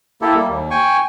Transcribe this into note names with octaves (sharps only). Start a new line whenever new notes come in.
A#3 E4 G4 A4
G3 A#3
D#2
G5 G#5 C#6